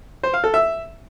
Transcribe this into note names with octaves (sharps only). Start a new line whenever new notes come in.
C5
F5
A4
E5